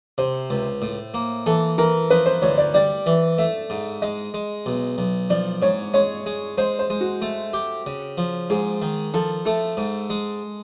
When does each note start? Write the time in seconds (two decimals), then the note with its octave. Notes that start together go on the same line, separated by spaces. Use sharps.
0.18 C3 C5
0.50 C#2
0.82 A2
1.14 A#3
1.46 E3 A4
1.78 E3 A#4
2.10 F3 B4
2.26 C5
2.42 D2 C#5
2.58 D5
2.74 G3 D5
3.06 E3
3.38 A3 E5
3.70 G#2
4.02 G#3 D#5
4.34 G#3
4.66 B1
4.98 B1
5.30 F3 D5
5.62 G#2 C#5
5.94 G#3 C#5
6.26 G#3
6.58 G#3 C5
6.79 C5
6.90 G#3
7.01 F#4
7.22 A3
7.53 G4
7.86 C#3
8.17 F3
8.50 G#2 G#4
8.82 D#3
9.14 F3 A4
9.45 A3 A4
9.77 G#2
10.10 G#3